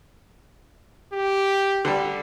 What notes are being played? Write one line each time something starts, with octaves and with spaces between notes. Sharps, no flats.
G4
D3 G3